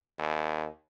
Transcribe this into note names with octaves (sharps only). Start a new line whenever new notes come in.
D#2